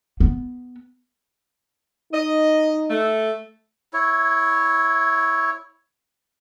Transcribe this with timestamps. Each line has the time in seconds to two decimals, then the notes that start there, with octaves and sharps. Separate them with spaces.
0.20 B3
2.13 D#4 D#5
2.90 A3
3.93 E4 C#5